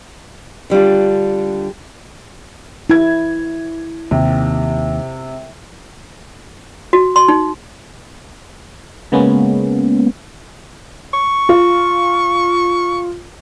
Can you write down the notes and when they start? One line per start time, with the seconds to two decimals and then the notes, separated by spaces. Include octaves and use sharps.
0.70 D3 G3 D4 F4
2.90 E3 E4 G#6
4.11 D#2 C3
6.93 F#4
7.16 C6
7.28 D#4
9.12 C#3 G#3 A#3 B3 C#4
11.14 C#6
11.49 F4